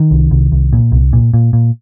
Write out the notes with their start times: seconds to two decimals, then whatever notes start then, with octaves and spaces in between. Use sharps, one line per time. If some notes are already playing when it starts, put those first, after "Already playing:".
Already playing: D#3
0.11 C2
0.31 C2
0.52 C2
0.73 A#2
0.92 C2
1.13 A#2
1.34 A#2
1.53 A#2